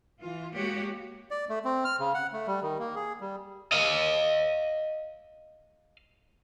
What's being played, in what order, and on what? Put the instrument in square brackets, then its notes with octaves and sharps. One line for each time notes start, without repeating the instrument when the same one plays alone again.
[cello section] E3 F4
G#3 A#3 F#4 G4 C#5
[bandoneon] D5
A3
C4
F6
C#3
F#5
A3
G3
D#3
A#3
G#4
G3
[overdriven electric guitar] D#5 F5